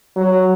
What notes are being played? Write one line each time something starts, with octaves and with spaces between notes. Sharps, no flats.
F#3